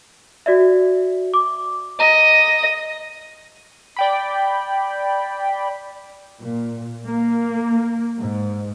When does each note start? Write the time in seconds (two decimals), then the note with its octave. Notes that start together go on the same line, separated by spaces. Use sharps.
0.46 F#4 D5 E5
1.34 D6
2.00 D#5 A#5
3.96 D5 G5 B5
6.41 A#2
7.06 A#3
8.19 G#2